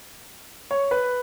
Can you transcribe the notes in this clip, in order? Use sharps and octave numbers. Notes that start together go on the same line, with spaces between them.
C#5
B4